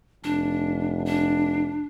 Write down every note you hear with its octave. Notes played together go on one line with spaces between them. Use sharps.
F1 D4
D4